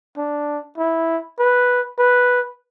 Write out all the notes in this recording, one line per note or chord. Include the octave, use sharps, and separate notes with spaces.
D4
E4
B4
B4